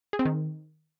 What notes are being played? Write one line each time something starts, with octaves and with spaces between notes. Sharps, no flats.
G#4
C4
D#3